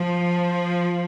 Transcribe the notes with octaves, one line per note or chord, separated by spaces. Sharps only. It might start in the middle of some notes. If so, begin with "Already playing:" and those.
Already playing: F3